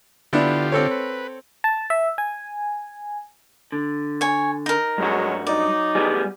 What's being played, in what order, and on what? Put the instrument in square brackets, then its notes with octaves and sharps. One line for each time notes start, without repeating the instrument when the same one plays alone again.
[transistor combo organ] D3 F4 G4 [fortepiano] B3 D4 E4
[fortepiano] C4 A4 C#5
[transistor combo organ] B4
[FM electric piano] A5
E5
G#5
[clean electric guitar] D3
[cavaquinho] C#5 G#5
D#4 A#4
[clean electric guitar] G2 F#4 [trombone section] F#3 G#3
[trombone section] F#3 D#4 [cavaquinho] D5
[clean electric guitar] G3 B3 G#4